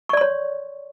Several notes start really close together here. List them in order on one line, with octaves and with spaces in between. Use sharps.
C#6 D5 C6 C#5